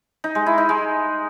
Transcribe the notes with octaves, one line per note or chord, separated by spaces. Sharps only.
D#4
G#3
E4
D#4
G#3